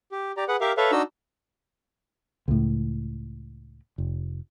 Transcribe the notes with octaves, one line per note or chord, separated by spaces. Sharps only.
G4
G4 D5 A#5
G#4 B4 F#5
G4 A#4 E5 F5
A4 B4 C#5 E5 F5
D4 D#4 F#4 D#5 E6
C#2 A2
F1